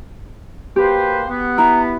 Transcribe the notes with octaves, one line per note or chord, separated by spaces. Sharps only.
A#3 G4 B4 C5
B3
E4 A#5